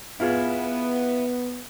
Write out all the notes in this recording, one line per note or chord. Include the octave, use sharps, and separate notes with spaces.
B3 E4 F4 G#4